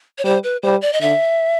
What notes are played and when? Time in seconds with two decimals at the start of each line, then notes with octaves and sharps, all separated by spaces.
0.18 C#5
0.24 G3 C5
0.44 B4
0.63 G3 C5
0.82 D5
0.93 D#5
1.01 D3 E5